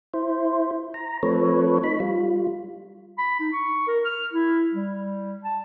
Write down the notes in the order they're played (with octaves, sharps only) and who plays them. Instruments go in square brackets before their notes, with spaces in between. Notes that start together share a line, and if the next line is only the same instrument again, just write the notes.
[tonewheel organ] E4 C5
A#5
F3 A3 C4 A4 B4 C#5
D#4 B5
G3 F4
[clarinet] B5
D#4
C#6
A#4
F6
E4
G3
A5